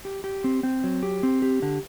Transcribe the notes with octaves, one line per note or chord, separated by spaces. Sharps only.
G4
G4
C4
C4
F#3
G4
C4
G4
D3